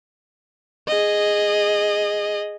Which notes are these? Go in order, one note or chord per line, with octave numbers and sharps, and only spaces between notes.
G#4 D#5